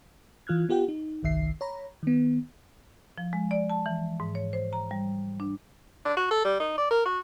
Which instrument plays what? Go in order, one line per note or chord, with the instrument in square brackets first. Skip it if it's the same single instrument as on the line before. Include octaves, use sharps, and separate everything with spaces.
[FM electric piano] E3 F4 F6 F#6 G#6
B3 F4 G4 F#5 G5
D#4
G1 C2 D#3 E5 C7
C#5 A#5 B5
D#3 B3
[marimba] F3
G#3
D5
A5
E3
G#2
C#5
C5
A#5
G3
D4
[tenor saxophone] D4
F#4
A4
G3
D#4
D5
A#4
F#4